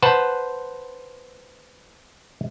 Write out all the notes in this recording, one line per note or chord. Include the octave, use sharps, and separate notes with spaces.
B4 C5 F#5 A5